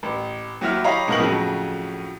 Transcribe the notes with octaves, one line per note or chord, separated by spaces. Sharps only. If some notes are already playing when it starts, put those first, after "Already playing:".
A1
D#2 F#3 E4 E5 F6
G4 C#5 D#5 F5 A#5 B5
E1 B2 D#4 A#4 D#5 F#7
F2 A2 C#3 F3 F#3